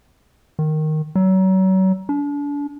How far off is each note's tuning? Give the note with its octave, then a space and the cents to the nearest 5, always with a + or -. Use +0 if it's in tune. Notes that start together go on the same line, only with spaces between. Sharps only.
D#3 -5
F#3 +35
D4 -35